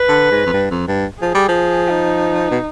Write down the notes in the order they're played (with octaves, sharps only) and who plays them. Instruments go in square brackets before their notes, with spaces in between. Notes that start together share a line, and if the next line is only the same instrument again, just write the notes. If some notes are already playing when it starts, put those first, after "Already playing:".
Already playing: [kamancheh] B4
[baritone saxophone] D3
G#2
F2
G2
F2
G2
[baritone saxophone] F3 [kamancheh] G#4
[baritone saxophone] G3
F3
[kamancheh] D#4
[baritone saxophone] B2